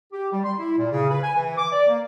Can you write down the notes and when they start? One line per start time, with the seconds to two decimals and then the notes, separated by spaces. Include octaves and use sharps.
0.12 G4
0.31 G3
0.44 C6
0.58 E4
0.78 A#2
0.92 C#3
1.10 B4
1.23 G#5
1.35 E3
1.57 D6
1.72 D5
1.88 A#3